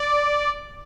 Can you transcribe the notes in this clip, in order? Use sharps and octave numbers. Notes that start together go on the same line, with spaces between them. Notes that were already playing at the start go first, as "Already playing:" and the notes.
Already playing: D5